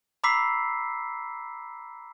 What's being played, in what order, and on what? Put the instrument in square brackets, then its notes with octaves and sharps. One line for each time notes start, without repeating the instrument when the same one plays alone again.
[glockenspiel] A#5 B5 D6 E6 B6 C7